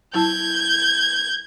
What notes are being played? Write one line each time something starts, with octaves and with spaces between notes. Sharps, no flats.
F#3 E4 A5 G6 G#6